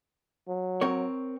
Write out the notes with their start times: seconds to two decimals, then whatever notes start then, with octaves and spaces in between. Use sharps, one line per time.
0.48 F#3
0.81 C4 A#4 C#5